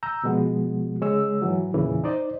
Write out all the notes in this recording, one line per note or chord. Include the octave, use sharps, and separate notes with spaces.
A#5 E6 G6
B2 F3 G#3 B3 F#4
C#3 G#3 C#5 E6
G#2 E3 F#3
E2 A#2 C#3 E3
D#4 C5 D5 D#5